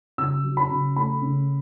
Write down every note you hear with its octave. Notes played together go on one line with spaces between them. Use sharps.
C#3 E6
F#3
B5
C#3
A3 B5
C#3